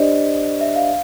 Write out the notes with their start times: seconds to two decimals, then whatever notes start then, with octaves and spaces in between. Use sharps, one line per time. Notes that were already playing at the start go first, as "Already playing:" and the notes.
Already playing: D4 G4 C5 D5 D#5
0.61 E5
0.76 F5